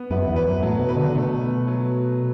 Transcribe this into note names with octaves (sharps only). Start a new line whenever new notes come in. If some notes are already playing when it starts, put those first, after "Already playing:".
Already playing: B3
F#2 B4
E2
B4
F#2
A2 F#3
B2
B4
D3
D3
B2 A3
A3
F#3